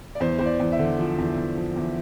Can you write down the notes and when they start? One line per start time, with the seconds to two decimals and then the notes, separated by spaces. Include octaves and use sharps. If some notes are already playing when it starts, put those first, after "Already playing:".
0.15 D5
0.20 E2 C5
0.39 E2 C5
0.46 D5
0.60 E2
0.72 E5
0.79 D3
0.98 F3
1.18 E2
1.37 E2
1.57 F3
1.76 E2